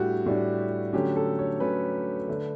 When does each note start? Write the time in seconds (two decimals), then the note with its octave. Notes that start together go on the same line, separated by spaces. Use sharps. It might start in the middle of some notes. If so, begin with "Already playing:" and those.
Already playing: A2 G3 D4 F#4 G4
0.26 A2 G3 D4
0.93 D3 F#3 A3 C#4 G4
1.16 A4
1.39 C#5
1.60 D3 F#3 A3 C#4 B4
2.28 D3 A3 D4